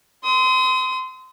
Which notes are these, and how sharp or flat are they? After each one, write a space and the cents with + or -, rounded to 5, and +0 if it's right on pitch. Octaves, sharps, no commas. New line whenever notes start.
C6 -25 D#6 +30